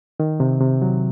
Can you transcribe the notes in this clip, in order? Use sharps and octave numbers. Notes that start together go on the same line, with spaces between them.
D#3
C3
C3
F#3